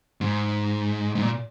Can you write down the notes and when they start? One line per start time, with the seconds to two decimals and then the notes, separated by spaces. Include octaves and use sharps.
0.21 G#2
1.15 G#2
1.22 A#2